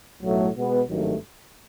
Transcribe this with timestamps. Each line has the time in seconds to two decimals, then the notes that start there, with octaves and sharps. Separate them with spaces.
0.21 B1 A2 F#3 A3
0.55 B2 G#3 B3
0.88 G#1 G2 D#3 F#3 A3